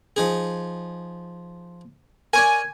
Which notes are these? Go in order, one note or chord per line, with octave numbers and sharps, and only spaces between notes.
F3 D#4 G#4
A#4 C#5 D5 G#5